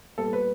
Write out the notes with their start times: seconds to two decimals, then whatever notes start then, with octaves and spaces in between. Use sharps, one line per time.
0.17 A#2 G3 B3 A4
0.33 B4